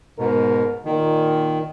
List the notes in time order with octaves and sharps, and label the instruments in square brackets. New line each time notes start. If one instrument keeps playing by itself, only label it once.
[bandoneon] G#2 B2 [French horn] A#4
[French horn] A#2 [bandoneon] D#3